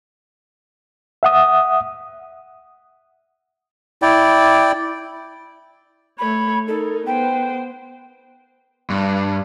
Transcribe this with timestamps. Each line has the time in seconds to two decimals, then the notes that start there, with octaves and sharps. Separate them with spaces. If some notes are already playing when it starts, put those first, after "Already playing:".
1.23 E5 F#5 D#6
4.02 E4 D5 G5
6.19 A3 C#5 B5
6.68 D#4 A4 A#4
7.07 B3 C5 G5
8.90 G2